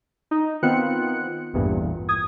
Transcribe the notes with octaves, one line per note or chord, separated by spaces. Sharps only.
D#4
D#3 B3 C4 F4 F#6 C#7
A1 E2 G2 A#2
D#6 G#6